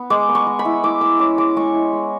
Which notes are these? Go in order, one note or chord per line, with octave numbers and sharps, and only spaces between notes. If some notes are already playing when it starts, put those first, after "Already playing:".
Already playing: B3
G#3 D6
B3
C#6
G#3
B5
E4
E4 D6
G#3 E6
C#4 D6
G#3 D6
G#3 C#6
E4
G#3